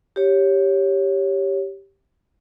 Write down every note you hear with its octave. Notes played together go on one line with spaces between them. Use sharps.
G4 C#5